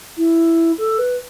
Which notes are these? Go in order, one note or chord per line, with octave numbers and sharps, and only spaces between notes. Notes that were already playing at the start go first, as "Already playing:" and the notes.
E4
A4
B4